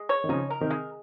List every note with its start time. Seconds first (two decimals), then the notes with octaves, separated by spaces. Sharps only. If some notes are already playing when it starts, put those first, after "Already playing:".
Already playing: G#3
0.09 C#5
0.24 D#3
0.29 C#3 F3 D#4
0.50 A#4
0.60 C3 D#3
0.70 G#3